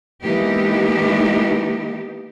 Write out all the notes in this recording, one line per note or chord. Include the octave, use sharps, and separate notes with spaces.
E3 G#3 A#3 B3 D#4 G4